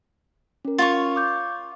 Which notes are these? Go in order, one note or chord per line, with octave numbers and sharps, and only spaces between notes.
C#4 A#4
F4 C#5 C#6
D6 G6